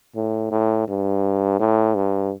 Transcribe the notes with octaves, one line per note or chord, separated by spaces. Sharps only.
A2
A2
G2
A2
G2